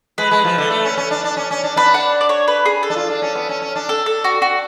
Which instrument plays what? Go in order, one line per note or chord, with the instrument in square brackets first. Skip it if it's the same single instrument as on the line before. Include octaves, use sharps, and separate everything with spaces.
[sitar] G#3 [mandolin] B4
[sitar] G#3
F3
D3
A3
C#4
C#4
D4
D4
C#4
C#4
D4
[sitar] D4 [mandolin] B4
[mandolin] F#5
D5
C#5
B4
G#4
A4
[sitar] D4
F4
D4
C#4
B3
C#4
C#4
D4
[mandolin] A4
A4
F#4
F#4